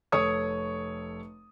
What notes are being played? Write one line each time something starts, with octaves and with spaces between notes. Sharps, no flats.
F1 A4 C#5 C#6 D#6 G#6